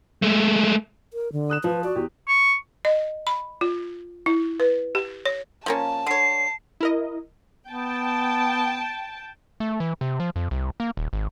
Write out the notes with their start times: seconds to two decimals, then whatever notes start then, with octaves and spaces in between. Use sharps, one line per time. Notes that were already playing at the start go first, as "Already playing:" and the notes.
0.22 G#3 A3
1.13 A#4
1.32 D3
1.50 D#6 F#6 E7
1.64 F3 B4
1.84 F#4 D5
1.95 E2 G4
2.28 C#6
2.85 D#5
3.27 B5
3.61 F4
4.26 E4
4.60 B4
4.95 G4
5.26 C#5
5.66 F3 A#3 C#4 A5
6.07 D3 C#5 C7
6.80 E4 A#4 D#5
7.67 B3 G5 A5
9.60 A3
9.80 E3
10.01 C3
10.20 F3
10.36 F2
10.51 C2
10.80 A#3
10.97 D#1
11.13 G#1